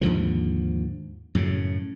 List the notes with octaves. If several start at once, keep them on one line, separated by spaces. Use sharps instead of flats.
D#2 G#2 D3 F3
F#2 A2 C#3